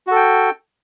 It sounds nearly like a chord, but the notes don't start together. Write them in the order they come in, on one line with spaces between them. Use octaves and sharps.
F#4 A4 G5